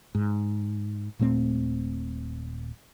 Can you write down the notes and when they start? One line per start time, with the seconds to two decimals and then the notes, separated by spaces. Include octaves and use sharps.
0.15 G#2
1.19 D#1 A#2 A3 C4